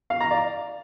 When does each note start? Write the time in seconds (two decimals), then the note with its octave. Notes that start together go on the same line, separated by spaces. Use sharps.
0.10 F5
0.20 A#5
0.31 D5